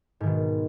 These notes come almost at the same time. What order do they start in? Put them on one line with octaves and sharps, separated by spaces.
G#2 D#3 B2